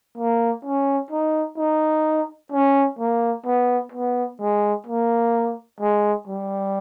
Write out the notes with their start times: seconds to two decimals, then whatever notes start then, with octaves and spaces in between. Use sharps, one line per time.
0.18 A#3
0.65 C#4
1.11 D#4
1.58 D#4
2.52 C#4
2.99 A#3
3.46 B3
3.92 B3
4.40 G#3
4.87 A#3
5.80 G#3
6.28 G3